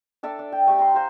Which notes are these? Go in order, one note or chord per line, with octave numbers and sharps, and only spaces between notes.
D4 A4 D5 E5
D4
G5
A3 G4 E6
A#5 C6
C5 F5 G#5 A#5